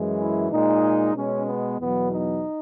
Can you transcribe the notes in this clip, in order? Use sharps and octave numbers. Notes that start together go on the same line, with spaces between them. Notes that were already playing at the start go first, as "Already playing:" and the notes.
Already playing: F#2 E3 G#3
E4
A#2 G#3 D#4
B2 G#3 C#4
B3
E2 B2 F#3 B3
D#4